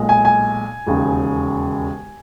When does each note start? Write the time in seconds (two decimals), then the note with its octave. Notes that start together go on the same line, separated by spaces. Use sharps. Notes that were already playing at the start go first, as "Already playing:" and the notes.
Already playing: B1 A#2 G#3
0.09 G#5
0.25 G#5
0.87 E1 D#2 C#3